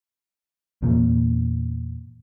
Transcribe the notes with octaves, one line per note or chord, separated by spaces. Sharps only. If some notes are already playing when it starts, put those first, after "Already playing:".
E2 A#2 A#3